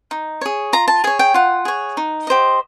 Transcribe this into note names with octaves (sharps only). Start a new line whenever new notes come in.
D#4
G#4 C#5
F4 A#5
A5
G#4 C#5 G#5
G5
F4 F#5
G#4 C#5
D#4
G4 C5 D#5